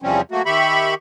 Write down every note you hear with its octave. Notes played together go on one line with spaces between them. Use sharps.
E2 C3 F3 G3 C4 C#4
F#3 A3 A#3 F#4
D#3 G4 E5 B5 C#6